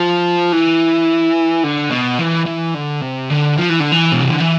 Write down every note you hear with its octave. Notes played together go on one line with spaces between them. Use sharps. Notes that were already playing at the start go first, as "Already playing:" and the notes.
Already playing: F3
E3
D3
B2
E3
E3
D3
C3
D3
F3
E3
D3
E3
B2
C3
D3
E3